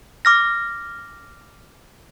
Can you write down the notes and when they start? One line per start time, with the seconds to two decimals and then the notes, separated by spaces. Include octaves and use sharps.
0.25 D6 F6 A#6